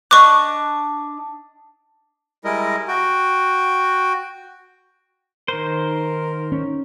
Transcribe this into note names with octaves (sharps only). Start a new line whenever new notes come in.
D4 D#5 C#6 D6 F#6
G3 G#3 E4 A#4 D#5
F#4 G5
D#3 A#4 C5
C#4